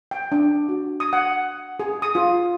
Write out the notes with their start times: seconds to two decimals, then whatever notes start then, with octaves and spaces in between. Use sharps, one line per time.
0.11 G5
0.32 D4
0.69 F#4
1.00 D#6
1.13 F#5
1.80 G#4
2.02 D#6
2.15 F4